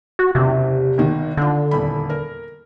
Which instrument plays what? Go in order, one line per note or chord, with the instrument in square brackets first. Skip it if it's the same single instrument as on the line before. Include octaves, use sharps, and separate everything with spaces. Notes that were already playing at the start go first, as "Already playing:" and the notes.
[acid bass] F#4
[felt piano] F#1 E2 [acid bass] C3
[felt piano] G#1 B2 D#3
[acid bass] D3 [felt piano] D4 F4
[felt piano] D#1 E2 B5
A#4